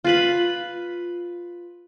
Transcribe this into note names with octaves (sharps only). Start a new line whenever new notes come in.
F4 B4 B5